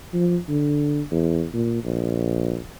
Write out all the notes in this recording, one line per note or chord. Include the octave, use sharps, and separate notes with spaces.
F3
D3
E2
A#2
A#1